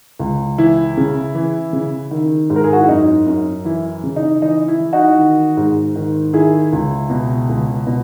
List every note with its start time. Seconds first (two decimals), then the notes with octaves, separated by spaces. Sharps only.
0.20 C#2
0.58 E3 E4
0.97 C#3
1.35 E3
1.73 C#3
2.11 D#3
2.50 G#2
2.56 A#4
2.64 G#4
2.73 F#4
2.80 E4
2.89 F#2 D#4
3.26 F#2
3.65 E3 E4
4.03 C#3
4.16 D#4
4.42 E3 D#4
4.68 E4
4.80 E3
4.93 D#4 F#4
5.19 D#3
5.57 G#2
5.96 D#3
6.33 D#3 E4 G#4
6.73 C#2
7.10 B2
7.49 C#2
7.87 B2